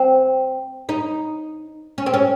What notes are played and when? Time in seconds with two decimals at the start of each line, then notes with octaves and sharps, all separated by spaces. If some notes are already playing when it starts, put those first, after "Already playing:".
Already playing: C4
0.89 D#4
1.98 C#4
2.06 C4
2.14 C#4